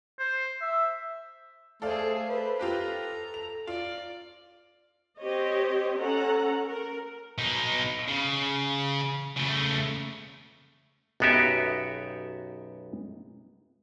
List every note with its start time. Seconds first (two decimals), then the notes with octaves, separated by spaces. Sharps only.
0.19 C5
0.61 E5
1.82 A3 G#4 A4 C5 D5 F5
2.29 B4 C5
2.59 F4 G4 A4 B4 A#5
3.34 F7
3.67 F4 D5
5.20 C4 G4 C5 C#5 D#5
5.99 C#4 A4 F#5 A#5
6.66 A#4
7.38 B2 D#4
8.08 C#3
9.37 C#3 A3
11.20 B1 F#2 B3 F#4 G4 E5